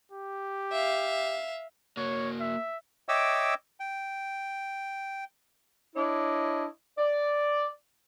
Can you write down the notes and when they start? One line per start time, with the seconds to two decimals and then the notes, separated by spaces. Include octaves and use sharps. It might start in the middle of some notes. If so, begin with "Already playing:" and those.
0.12 G4
0.72 E5 F5
1.97 A#3 F#4 C#5
2.40 E5
3.09 C#5 D#5 E5 G5 D6 E6
3.80 G5
5.96 D4 E4 C#5 D#5
6.98 D5